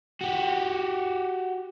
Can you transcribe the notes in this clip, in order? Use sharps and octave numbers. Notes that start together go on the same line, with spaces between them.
F#4 G4